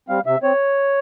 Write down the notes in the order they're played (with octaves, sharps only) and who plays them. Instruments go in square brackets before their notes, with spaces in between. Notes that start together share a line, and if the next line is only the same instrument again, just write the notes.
[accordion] G3 C4 F5
C3 E5
C4 C#5